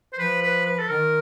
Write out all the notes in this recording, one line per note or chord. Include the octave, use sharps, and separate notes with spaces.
C5
F3 B4
B4
B4
A4
D#3 A#4